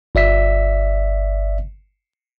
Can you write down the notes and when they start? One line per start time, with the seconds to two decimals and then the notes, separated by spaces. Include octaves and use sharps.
0.15 G1 D5 E5 B6